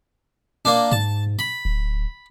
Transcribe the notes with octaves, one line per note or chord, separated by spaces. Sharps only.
A#3 D4
G#2 A5
B5
D1